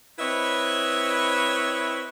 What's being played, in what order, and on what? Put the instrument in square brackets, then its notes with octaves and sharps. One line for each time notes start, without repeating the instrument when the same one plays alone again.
[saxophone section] C4 E4 B4 C#5 D#5 E5